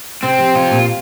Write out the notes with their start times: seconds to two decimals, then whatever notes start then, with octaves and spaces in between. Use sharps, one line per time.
0.23 C3 C4
0.39 F3
0.55 C3 F4
0.71 A#2